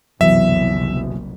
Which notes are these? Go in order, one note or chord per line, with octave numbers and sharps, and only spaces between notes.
F#1 C2 F2 B2 E3 F#3 E5